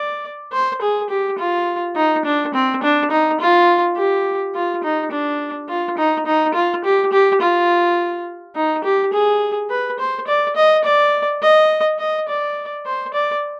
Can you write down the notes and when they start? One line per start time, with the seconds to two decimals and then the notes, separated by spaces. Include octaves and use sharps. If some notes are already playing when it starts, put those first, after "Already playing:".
Already playing: D5
0.53 C5
0.82 G#4
1.10 G4
1.39 F4
1.96 D#4
2.25 D4
2.54 C4
2.83 D4
3.11 D#4
3.40 F4
3.97 G4
4.55 F4
4.83 D#4
5.11 D4
5.69 F4
5.98 D#4
6.26 D#4
6.54 F4
6.84 G4
7.12 G4
7.41 F4
8.56 D#4
8.84 G4
9.13 G#4
9.70 B4
9.99 C5
10.27 D5
10.56 D#5
10.84 D5
11.42 D#5
11.99 D#5
12.29 D5
12.86 C5
13.14 D5